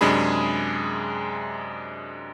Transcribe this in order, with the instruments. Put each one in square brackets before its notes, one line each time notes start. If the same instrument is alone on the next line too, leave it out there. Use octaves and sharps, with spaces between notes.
[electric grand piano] F#2 C3 G#3 D4 G#4 B5